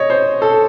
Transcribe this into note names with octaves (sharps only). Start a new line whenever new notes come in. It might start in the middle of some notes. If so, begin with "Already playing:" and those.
Already playing: C#5 D#5
C5
A4